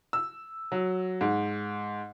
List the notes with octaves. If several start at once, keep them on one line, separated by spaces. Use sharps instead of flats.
E6
F#3
G#2